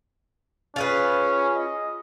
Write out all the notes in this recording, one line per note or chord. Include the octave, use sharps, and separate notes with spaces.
C#4 F4 G#4 B4
D#5